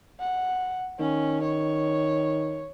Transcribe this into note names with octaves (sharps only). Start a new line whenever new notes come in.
F#5
D#3 C#4
C#5